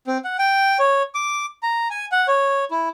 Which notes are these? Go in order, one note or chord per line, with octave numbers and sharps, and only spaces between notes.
C4
F#5
G5
C#5
D6
A#5
G#5
F#5
C#5
E4